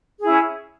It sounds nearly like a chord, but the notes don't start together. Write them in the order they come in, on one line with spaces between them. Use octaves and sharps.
G#4 E4 C#4